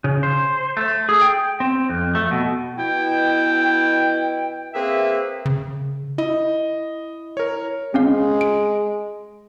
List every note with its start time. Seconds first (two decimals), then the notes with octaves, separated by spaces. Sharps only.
0.04 C#3
0.23 C5
0.77 A3
1.09 G#4
1.21 G5
1.60 C4
1.90 F2
2.15 A3
2.31 B2
2.78 B2 E4 G5
4.74 A#3 C4 G#4 B4 E5
5.45 C#3
6.18 E4 D#5
7.37 A#4 C#5
7.94 G#3 C4 C#4 F5
8.41 D7